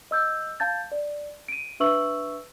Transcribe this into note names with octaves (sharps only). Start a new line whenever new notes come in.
D#5 E6 G6
F5 A5 G6 A6
D5
D7 D#7
D4 B4 E5 C#6 E6 F#7